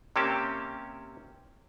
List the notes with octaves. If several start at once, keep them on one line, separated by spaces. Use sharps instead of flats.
C3 A#3 C4 C#4 G4 A5